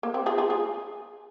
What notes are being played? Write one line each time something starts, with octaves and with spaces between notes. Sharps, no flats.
A#3
C4
F4 G#4
F4 G#4
F4 G#4